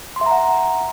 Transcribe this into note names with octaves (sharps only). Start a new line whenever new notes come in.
E5 F#5 A#5 C6